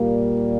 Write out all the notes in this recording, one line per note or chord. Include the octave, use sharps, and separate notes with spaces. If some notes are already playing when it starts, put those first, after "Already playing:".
Already playing: A#2 G3 A#3